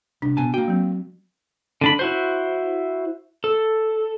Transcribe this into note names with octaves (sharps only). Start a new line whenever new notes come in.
C2 D4
B2 G#5 A5
A#3 F#4 G5
F#3 C4
D3 D4 B5
E4 F#4 C5
A4